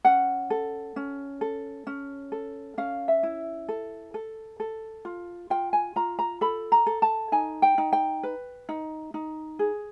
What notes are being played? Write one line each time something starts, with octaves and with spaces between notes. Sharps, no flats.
C#4 F#5
A4
C#4
A4
C#4
A4
C#4 F5
E5
E4
A4
A4
A4
F4
F4 G5
G#5
F4 A#5
A#5
A4 B5
A#5
A4
A5
D#4 G#5
G5
D#4
G5
B4
D#4
D#4
G#4